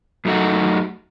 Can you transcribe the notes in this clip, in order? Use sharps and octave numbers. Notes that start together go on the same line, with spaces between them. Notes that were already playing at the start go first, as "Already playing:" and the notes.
F#2 A3 D#4 F#4